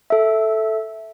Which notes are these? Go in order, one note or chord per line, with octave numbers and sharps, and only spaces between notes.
A4 E5